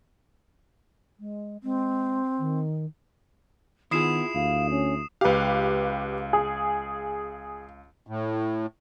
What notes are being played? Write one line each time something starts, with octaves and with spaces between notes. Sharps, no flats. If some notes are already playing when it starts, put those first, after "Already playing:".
G#3
G#3 C4
D#3
D#3 B3 E4 F4 G#4 D#6 C7 E7
D2 F5
C#4
C#2 G4 B4 F5
G#4
A2